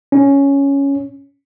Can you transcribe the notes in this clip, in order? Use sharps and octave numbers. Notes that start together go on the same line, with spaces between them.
C#4